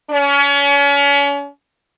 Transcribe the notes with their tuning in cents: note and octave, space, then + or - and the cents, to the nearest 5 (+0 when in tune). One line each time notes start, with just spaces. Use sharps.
C#4 +35